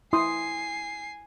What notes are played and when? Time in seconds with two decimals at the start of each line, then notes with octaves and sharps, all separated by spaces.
0.13 E4 G#5 C6 D#6 C7